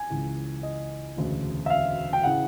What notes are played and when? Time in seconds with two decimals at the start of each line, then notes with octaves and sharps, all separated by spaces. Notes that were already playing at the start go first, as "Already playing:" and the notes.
Already playing: G#5
0.10 C#2 C#3 E3
0.63 D#5
1.17 E1 D2 C#3
1.66 E5
1.70 F5
2.13 G5
2.23 C#3 E3 F#5